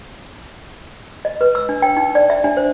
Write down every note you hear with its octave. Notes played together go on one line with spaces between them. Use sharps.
D#5
B4
E6
D4
G5
D#4
D5
E5
D4
C5